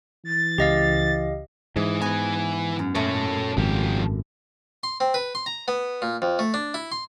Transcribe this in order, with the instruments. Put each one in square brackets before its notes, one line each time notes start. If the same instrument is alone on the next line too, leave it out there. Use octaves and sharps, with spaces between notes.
[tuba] E3 [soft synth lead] A6
[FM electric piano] C#2 C#3 [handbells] G4 D#5 F5
[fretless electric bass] G#2 [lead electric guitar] E3 [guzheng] G#4
[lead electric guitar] E3 G#5 [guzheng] B3 F#4
[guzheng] F#2
[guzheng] F#2 A#2 A3 [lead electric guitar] A4 C#5
[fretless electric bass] G#1 [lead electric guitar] F3 G4
[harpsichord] C6
C4
B4
C6
A#5
B3
A#2
F2
A3
D4
E4
C6